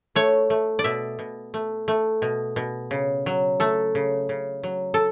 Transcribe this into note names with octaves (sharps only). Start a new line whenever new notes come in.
A3 C#5
A3
D5
B2 E5
B2
A3
A3
B2
B2
C#3
F#3
A3 A4
C#3
C#3
F#3
A4